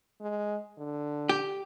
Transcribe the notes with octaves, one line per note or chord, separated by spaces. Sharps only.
G#3
D3
G4